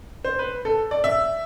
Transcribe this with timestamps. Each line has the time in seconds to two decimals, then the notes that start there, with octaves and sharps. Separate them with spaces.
0.24 C5
0.39 B4
0.65 A4
0.91 D5
1.04 E5